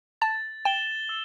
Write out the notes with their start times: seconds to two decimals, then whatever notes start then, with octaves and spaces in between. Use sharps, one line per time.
0.21 A5 A6
0.65 G5 E7 G7
1.09 E6